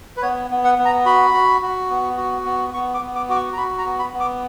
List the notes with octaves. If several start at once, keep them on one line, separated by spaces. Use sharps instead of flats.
B4
B3 C#5
B3
F#5
B3
A#5
F#4 B5
F#4
F#4
B3
F#4
B3
B3 C#6
D6
B3
D6
F#4 D6
C#6
A#5
F#4 B5
A#5
B3
B5
B3
D6